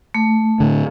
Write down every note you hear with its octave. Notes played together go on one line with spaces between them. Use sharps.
A3
A2 D3